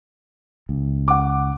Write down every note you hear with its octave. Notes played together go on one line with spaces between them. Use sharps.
C#2
F#5 D6